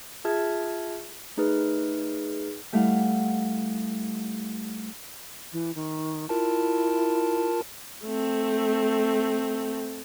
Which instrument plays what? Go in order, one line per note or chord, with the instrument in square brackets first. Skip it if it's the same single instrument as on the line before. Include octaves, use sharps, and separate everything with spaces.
[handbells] F4 G#4 E5 A5 F6 G#6
A3 D#4 G#4 B4 F6
[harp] G3 A3 E4 F5 F#5
[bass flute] E3
D#3
[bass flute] E4 [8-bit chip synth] F4 A#4 A5
[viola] A3 C4